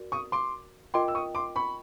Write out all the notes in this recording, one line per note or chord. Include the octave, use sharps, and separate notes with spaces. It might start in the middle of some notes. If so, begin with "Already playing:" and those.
Already playing: F#4 A#4 D5
C#6 D#6
C6 D6
F4 A#4 D#5 G5 C6 D6
E6
C#6 D#6
C6 D6
B5 C#6